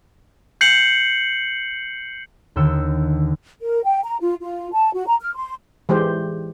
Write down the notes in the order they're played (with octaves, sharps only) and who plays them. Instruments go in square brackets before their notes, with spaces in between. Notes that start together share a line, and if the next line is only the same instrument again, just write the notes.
[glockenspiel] G6 C7 C#7 F#7
[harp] D#2 D3 G5 E6 C#7 E7
[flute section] A#4
G5
A#5
F4
F4
A5
F#4
A#5
F6
C6
[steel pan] E3 G#3 G4 C5